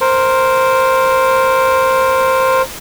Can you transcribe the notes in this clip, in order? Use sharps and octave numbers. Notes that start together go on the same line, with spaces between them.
A#4 C5